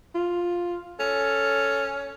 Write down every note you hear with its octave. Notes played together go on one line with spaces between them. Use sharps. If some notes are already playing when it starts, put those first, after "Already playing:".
F4
C#4 A4